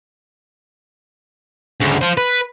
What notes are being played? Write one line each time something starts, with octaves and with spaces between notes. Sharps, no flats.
D2 C#3
F4 C5
B4